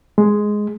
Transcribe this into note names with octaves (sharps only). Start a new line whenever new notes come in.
G#3